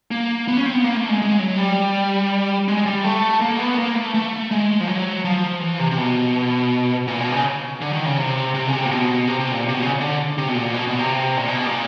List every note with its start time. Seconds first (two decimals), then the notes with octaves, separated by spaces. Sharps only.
0.11 A#3
0.48 B3
0.57 C#4
0.66 C4
0.75 B3
0.84 A#3
0.97 A3
1.09 G#3
1.22 G#3
1.39 F#3
1.58 G3
2.68 G#3
2.86 G3
3.04 A3
3.41 A#3
3.59 B3
3.78 A#3
3.95 A3
4.14 A3
4.51 G#3
4.80 F3
4.88 F#3
5.25 F3
5.61 E3
5.79 C3
5.91 C3
5.98 B2
7.07 A#2
7.20 B2
7.32 C#3
7.81 D3
7.93 D#3
8.05 C#3
8.17 C3
8.54 C3
8.68 C#3
8.72 C3
8.85 A#2
8.91 B2
9.27 C3
9.40 C3
9.52 A#2
9.68 C3
9.74 B2
9.82 C#3
10.01 D3
10.38 C3
10.48 B2
10.56 A#2
10.74 B2
10.87 B2
10.99 C3
11.37 A#2
11.48 B2
11.66 A#2